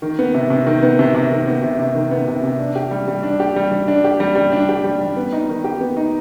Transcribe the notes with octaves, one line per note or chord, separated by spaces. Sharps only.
D#3
B3
C3
C3
D#3
B3
C3
C3
D#3
B3
C3
C3
D#3
B3
C3
C3
D4
G4
G3
G3
D4
G4
G3
G3
D4
G4
G3
G3
D4
G4
G3
G3
B3
D#4
D#3
G4
B3
D#4